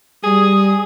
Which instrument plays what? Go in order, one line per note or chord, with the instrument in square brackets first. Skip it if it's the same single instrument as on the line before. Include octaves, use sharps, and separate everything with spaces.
[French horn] G3 [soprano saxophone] G#4 [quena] D#6